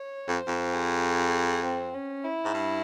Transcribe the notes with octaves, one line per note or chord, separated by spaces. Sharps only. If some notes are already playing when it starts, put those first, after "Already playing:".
Already playing: C#5
F2 C5
F2
G#4
C4
C#4
E4
G#2
G2